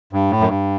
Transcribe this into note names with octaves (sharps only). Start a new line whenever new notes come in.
G2
A2
F#2
G2